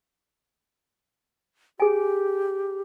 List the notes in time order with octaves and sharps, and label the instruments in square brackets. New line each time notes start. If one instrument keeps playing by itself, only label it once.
[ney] G4 [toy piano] G#4 G#5